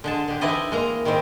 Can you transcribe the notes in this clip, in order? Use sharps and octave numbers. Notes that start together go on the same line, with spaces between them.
D3 G#3 A5
D3 G4
E3 C4 D#4 E4 D5 D#5
G#3 A#3 A#5
D#3 G3 G#3 C4